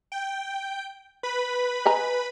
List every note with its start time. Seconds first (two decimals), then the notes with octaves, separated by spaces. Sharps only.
0.12 G5
1.23 B4 B5
1.85 D#5 G#5 A#5